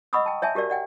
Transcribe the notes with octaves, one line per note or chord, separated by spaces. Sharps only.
D#5 F#5 B5 C#6 D#6 E6
G5 A5
C#5 E5 G#5 A5
F#4 G4 A#4 D5 F5
D5 F#5 G5